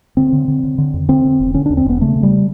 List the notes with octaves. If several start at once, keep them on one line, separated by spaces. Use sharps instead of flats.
D3 C4
D3
D3
D3
D3
F2
D3 C4
D3
E1
D3 C#4
D#2 D4
C4
E1 B3
C#3 A3
C#3
G3